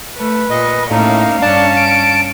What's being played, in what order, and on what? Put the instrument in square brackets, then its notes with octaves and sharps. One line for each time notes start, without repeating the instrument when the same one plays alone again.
[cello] A3 [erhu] B4
[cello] A#2 [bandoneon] D#5
[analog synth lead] A2 [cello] A#3 C#4 [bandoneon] D#4 [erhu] F5
[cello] G2 C#4 [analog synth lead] D4 [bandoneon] A5
[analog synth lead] D7